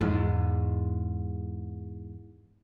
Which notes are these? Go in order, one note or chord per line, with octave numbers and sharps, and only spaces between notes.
E2 G#2